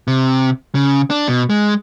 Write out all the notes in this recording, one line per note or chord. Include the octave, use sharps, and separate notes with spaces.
C3
C#3
D4
B2
G#3